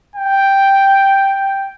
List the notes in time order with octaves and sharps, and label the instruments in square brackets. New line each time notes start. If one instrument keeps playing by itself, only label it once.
[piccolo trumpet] G5